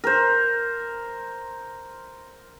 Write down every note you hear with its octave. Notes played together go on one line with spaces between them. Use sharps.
A#4 C5